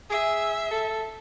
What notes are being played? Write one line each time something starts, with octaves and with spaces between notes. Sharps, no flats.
G#4 E5
A4